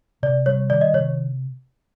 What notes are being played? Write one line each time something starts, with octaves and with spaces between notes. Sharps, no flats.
C3 D5
G3 C#5
D#3 D5
D#5
C3 C#5